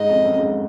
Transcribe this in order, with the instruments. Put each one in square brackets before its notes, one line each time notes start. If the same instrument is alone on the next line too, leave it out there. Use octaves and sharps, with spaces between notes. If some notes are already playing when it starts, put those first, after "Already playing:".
Already playing: [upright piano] G#2 [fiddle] D#5
[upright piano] F2
F#2
G#2